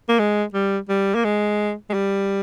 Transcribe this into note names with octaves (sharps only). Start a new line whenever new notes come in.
A#3
G#3
G3
G3
A#3
G#3
G#3
G3